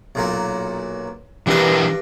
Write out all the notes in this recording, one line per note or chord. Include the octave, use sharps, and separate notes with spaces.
B1 A#2 F#3
G2 E3 D4 A#4 B4